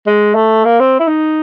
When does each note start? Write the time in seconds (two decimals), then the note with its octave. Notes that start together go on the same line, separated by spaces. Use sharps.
0.06 G#3
0.35 A3
0.65 A#3
0.80 C4
1.00 E4
1.08 D#4